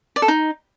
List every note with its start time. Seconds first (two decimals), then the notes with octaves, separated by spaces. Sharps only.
0.16 D5
0.22 A4
0.28 D#4